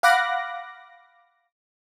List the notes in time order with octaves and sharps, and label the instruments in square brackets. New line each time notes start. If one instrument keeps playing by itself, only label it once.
[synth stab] F5 F#5 B5 D6 F#6 A#6